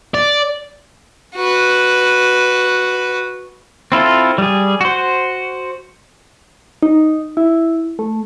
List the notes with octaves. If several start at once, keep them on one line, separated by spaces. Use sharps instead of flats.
D5
F#4 B4
C4 E4 F4 A4
G3 G#4
F#4 C5
D#4
E4
A3